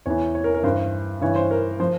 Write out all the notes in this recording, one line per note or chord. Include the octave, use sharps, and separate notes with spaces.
E2 E3 C#5
C#5
A#4
A#4
G2 E3 C5
G2 E3 C#5
C5
A#4
F3 C5